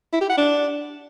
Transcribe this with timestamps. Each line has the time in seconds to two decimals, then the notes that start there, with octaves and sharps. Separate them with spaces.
0.13 E4
0.21 G4
0.29 F#5
0.38 D4